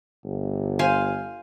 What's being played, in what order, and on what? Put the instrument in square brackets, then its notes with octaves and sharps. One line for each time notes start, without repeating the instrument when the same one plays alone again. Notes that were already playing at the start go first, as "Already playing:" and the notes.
[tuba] G1
[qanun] C5 F5 G#5